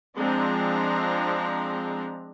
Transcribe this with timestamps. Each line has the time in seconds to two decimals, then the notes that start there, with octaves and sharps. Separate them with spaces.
0.17 F3 G#3 C4 D4 A#5